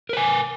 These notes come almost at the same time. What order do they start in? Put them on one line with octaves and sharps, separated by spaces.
A#4 B4 G#5